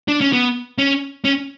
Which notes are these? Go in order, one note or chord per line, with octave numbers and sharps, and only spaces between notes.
D4
C#4
B3
C#4
C#4